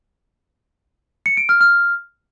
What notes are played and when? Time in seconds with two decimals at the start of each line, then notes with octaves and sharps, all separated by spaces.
1.26 C#7
1.37 D7
1.49 F6
1.61 F6